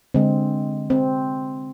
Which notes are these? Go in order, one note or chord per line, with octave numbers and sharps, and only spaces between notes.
D3 G#3 C4
C4